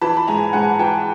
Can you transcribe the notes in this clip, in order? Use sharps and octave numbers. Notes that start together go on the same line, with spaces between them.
E3 A5 B5
B5
G#2 G#5 A#5
G#2 F#5 G#5
E3 G5 A5